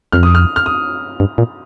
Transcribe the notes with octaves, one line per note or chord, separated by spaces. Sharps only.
F2 F6
D#6
F6
F6
D#6
G2
A#2